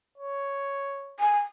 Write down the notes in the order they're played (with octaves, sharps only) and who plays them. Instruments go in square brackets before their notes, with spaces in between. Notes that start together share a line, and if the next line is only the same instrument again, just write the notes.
[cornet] C#5
[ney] G#5